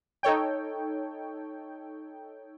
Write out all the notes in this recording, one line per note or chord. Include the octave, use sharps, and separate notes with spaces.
D#4 A4 C#5 G5